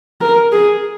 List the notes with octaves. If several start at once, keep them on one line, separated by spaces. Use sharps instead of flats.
A#4
G#4